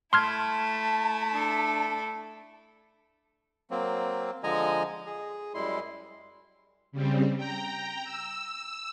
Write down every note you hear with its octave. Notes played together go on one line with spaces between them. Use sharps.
A3 E4 A5 C6 F6 G#6
D4 A4
F#3 A#3 C4
D3 F3 G#3 D#5 G#5 A#5
G#4
F#2 G3 G#3 E4 C6
C#3 G3 C4
G5 A#5
E6